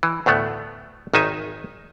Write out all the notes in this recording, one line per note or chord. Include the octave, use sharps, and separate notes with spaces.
E3
D2 A2 A3 B3
G#1 D#3 D#4 E5 G#5